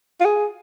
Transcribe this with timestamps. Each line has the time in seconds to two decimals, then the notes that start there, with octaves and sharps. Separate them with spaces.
0.20 F4
0.25 G#4